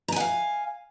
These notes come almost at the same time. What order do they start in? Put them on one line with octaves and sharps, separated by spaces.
A#5 G#5 F#5 F5